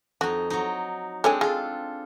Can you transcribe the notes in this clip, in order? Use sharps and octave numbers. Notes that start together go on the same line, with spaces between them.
F2 D#4 F#4
F#3 D#4
G#3 C4 D4 A4 C#5 G#5
G#3 F4 A4